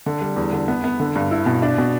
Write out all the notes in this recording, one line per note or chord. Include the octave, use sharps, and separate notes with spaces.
D3
G3
E2
D3
B3
B3
D3
G2
E4
B2
D4
B2